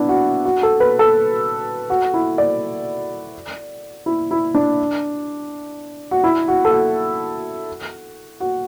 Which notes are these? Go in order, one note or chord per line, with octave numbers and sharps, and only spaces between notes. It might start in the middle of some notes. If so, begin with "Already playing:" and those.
Already playing: B3 D4 E4
F#4
F#4
A4
B4
A4
F#4
E4
D5
E4
E4
D4
F#4
E4
F#4
A4
F#4
F#4